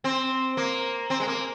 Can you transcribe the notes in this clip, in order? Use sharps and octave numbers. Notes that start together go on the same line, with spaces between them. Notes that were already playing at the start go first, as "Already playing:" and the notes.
C4
A#3
C4
G#3
A#3